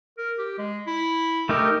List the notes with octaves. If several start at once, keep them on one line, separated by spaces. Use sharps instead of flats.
A#4
G4
G#3
E4
A3 D#4 G4 A#4